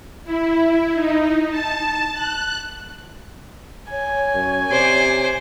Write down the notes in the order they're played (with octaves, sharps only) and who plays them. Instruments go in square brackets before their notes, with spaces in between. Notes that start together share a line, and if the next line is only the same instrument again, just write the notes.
[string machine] E4
D#4
A5
F#6
[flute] C#5 [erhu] G#5
[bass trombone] F#2
[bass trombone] C3 [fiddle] C5 D5